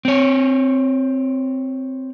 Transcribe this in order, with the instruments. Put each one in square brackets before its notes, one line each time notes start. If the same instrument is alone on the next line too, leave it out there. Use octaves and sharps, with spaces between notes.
[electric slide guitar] C4 C#5